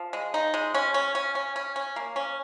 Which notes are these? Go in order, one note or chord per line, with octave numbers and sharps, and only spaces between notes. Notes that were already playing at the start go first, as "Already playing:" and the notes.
Already playing: F3
G#3
D#4
G#3
C#4
C#4
C#4
C#4
C#4
C#4
A#3
C#4